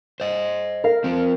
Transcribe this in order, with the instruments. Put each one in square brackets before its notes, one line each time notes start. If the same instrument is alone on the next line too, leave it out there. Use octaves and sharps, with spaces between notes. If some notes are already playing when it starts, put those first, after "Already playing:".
[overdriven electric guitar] C5 D#5
[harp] A#4 F5
[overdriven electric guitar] F3 C4